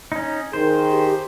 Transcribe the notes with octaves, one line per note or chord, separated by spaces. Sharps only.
C#4 D#4
D#3 G#4 C5
G4